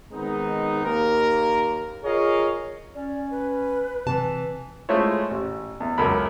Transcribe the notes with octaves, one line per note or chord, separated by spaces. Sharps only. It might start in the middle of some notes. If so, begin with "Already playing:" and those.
D#3 G#3 B3 C4 D#4
D#2 A#3 A#4
F4 G#4 A#4 C#5 D#5 F5
C#4 D5
B4
C3 E3 A5
G#3 A3 E4 F4 C5 C#5
A1
E2
C#2 F#2 A4 A#4 B5